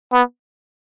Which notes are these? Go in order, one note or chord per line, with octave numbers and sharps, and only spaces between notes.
B3